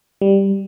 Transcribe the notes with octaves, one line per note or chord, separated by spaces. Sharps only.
G3